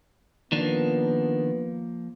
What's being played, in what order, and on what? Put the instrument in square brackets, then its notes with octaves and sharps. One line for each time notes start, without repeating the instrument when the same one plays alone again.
[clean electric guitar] D#3 D4 [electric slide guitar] F3 A#3 [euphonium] B3